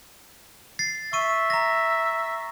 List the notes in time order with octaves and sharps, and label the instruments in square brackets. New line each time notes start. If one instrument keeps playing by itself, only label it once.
[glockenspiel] A6 C7
[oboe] E5 [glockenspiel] C#6 D#7
[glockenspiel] A#5 A#6